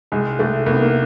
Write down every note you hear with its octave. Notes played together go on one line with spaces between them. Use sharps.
C2 G#3
C2 A3
C2 A#3
B3
A#3